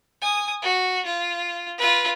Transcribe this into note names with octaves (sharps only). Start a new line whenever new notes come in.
G#5 D#6
F#4
F4
F4 B4